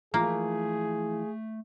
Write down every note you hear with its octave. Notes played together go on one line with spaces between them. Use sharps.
E3 F3 A3 A#3 F4 G#4